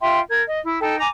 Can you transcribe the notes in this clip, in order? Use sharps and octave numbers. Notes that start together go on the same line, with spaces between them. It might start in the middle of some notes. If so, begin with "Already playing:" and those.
F4 E5 G5 C6
A#4 G#6
D#5
E4
D#4 A4 G5
G#5 A#5 D6